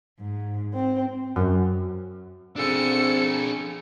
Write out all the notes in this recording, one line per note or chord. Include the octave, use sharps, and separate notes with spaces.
G#2
C4
F#2
C4 D4 G#4 A4 C#7